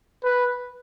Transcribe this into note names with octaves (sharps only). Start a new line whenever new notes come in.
B4